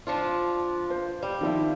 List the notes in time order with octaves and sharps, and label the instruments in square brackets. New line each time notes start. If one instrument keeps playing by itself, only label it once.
[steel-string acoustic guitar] F3 D4 F4
[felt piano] C5
[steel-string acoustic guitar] G3
[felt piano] D#3 F3 E4